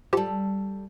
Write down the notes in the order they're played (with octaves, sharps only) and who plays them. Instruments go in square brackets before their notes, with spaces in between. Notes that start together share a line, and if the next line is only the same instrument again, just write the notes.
[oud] G3 A4 [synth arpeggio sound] F4 G4 C5